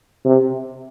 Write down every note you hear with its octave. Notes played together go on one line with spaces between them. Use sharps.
C3